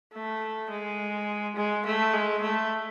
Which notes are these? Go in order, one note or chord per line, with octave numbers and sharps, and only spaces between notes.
A3
G#3
G#3
A3
G#3
A3